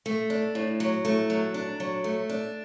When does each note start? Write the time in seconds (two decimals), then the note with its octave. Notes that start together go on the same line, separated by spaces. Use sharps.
0.06 A3
0.30 D4
0.55 A2
0.80 F#3
1.05 A3
1.30 F#3
1.54 D4
1.80 F#3
2.04 A3
2.30 D4